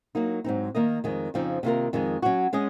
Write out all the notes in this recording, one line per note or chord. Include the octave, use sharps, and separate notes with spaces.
F#3 A#3 D#4
G#2 F#3 C4 D#4
D#3 A#3 D#4 A#4 D#5
F2 D#3 G#3
F2 C#3 F3 C4 D#4
C3 D#3 A#3 F4 A#4
F2 D#3 G#3
F#3 C#4 F#4
G#3 C#4 G#4 D#5